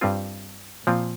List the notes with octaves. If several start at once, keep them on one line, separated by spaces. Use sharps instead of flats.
G2 G3 C4 F4
A#2 F3 C4 F4